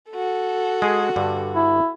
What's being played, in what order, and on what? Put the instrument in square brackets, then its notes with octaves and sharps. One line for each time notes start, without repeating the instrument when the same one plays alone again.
[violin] F#4 A4
[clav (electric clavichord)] G#3 G#4
G2 D3
[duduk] E4